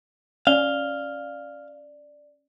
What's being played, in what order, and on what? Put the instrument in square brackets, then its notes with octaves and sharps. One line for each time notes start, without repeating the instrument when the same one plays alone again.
[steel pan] C#4 [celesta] D5 F7 G7 [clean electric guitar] F5